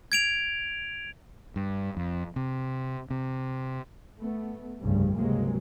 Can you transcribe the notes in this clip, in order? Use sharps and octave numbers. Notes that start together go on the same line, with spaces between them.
G#6 D7 F7
G2
F2
C3
C3
A3 B3
F1 C2 G2 C#3 G3
C#2 G2 C3 F#3 G#3 A#3